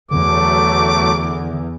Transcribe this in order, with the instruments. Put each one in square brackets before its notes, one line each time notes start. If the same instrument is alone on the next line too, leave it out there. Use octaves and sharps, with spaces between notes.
[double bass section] E2 [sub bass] D3 [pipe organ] F#3 A3 [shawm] D6